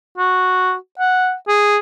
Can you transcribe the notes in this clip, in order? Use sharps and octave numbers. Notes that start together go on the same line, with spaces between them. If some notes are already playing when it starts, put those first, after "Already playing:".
F#4
F#5
G#4